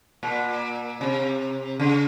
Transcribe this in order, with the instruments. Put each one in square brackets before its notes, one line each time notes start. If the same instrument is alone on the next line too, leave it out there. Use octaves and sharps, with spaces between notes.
[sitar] A#2
C3
C#3